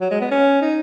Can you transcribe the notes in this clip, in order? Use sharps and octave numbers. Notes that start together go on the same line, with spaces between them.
F#3
G#3
B3
C#4
D#4